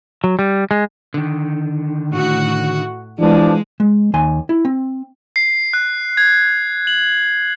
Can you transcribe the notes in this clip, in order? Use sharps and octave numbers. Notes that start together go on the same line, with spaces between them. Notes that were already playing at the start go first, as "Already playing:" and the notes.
F#3
G3
G#3
D3 D#3
A2 F#4
B2 E3 F3 G#3 D4
G#3
D#2 D#3 G#5 C6
E4
C4
C7
F#6
G#6
F#7